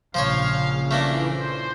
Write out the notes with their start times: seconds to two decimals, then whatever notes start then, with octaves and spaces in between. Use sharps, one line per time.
0.14 A#1 C#3 F3 C5 C#5 F5
0.91 E3 A3 A#3 D4
1.30 C5